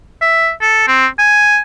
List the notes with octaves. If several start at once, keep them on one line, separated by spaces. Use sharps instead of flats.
E5
A4
C4
G#5